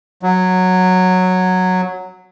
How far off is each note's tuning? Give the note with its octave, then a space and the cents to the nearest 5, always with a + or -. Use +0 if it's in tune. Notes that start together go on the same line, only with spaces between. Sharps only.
F#3 -5